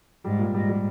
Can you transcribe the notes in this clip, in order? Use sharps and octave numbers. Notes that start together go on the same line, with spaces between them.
G#2 G3
A#2
G#2 G3
G3